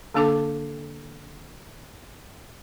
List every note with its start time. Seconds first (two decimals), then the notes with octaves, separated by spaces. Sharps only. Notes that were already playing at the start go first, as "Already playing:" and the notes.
0.14 D3 A#3 D4 A4 A5 D6